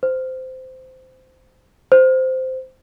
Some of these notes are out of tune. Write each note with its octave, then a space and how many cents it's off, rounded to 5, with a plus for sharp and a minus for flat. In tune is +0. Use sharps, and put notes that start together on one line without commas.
C5 -15
C5 -10